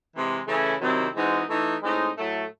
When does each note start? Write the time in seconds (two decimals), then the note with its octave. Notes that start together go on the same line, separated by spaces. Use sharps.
0.14 C3 E3 G#3
0.47 C#3 E3 A3 C#4 E4
0.81 C3 D#3 F#3 C4 E4
1.15 E3 G#3 C4 D#4 F#4
1.49 E3 A3 D#4
1.83 A2 G#3 C4 D#4
2.17 A2 F#3 A3